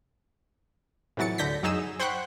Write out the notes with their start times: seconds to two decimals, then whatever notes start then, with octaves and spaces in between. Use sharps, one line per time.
1.17 A2 C3 E3 F#3 A6 C#7
1.38 D2 D3 G6 A#6 B6
1.63 F#2 F#3 D#4 G#4 E6
2.00 C5 F#5 G5 B5 C#6 F#6